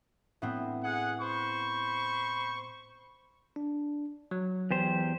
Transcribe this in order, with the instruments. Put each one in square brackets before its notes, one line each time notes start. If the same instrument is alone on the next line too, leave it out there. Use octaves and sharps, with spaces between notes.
[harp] A2 B3 C4
[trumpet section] G#4 F#5
C5 B5 C#6
[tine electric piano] D4
F#3
[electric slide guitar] E2 G4 C5